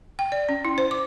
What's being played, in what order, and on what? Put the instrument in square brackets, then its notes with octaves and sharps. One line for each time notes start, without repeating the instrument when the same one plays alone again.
[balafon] G5
D5
C#4
E4
C5
D6